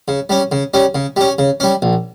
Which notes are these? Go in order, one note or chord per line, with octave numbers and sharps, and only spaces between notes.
C#3
G3 C#4
C#3
G3 C#4
C#3
G3 C#4
C#3
G3 C#4
A#1